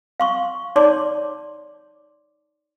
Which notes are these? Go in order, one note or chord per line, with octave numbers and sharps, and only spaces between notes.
F5 C6 C#6
D#4 C#5 D5 A5 C6 D6